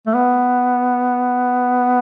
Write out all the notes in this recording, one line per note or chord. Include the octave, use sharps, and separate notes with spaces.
A3
B3